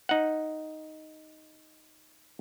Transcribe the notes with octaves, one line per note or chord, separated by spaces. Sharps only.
D#4 F#5